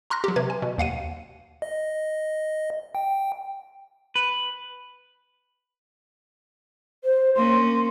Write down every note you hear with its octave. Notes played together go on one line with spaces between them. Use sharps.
A#5 C6 F6 F#6 A#6
F#3 G4
C3 B4 G#6
G#5
B2
D#2 F5 F#5 D#7
D#5
G5
B4
C5
A#3 C#4 C6